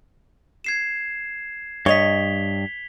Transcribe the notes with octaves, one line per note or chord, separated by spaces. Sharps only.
G#6 C7 E7
G2 C#5 D#5 B6 F7 G7